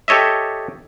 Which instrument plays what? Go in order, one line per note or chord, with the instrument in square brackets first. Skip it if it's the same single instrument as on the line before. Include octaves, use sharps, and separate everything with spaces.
[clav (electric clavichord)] G4 A4 C#5 D#5 E5